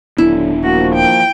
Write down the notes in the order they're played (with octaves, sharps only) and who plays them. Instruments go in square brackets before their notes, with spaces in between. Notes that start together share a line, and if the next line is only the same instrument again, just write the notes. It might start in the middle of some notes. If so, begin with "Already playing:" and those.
[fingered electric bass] D#1 B3 D4 [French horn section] D3 F#3 [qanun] E4
[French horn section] F3 A#3 [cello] F#4
[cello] G5